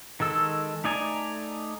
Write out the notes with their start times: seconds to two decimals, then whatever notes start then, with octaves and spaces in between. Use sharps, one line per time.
0.20 D#3 G#3 A4 E6
0.84 A3 D#4 D5 G#5 A#5